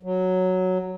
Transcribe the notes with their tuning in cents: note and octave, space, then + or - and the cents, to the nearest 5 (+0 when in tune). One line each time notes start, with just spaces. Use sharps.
F#3 +0